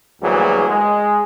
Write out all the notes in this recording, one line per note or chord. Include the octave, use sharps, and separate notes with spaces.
D2 E3 F#3 G3 A#3 G#4
G#3